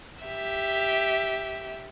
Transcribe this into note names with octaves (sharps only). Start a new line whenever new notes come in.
G4 E5